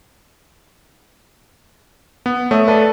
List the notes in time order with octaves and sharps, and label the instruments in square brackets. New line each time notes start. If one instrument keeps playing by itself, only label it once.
[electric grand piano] B3
[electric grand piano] A3 [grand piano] C#5 E5 D#6
[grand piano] A4 B4 D5